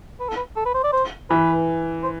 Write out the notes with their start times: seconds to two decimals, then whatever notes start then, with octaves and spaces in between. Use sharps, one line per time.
0.20 B4
0.28 A4
0.36 B4
0.56 A4
0.65 B4
0.75 C5
0.84 D5
0.92 C5
1.30 E3 B4
2.04 C5